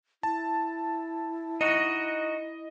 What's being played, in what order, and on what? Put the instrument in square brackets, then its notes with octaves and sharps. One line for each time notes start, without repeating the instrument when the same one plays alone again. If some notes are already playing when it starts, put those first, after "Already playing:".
[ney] E4 [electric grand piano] A5
[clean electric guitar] D#4 F#4 [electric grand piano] D#5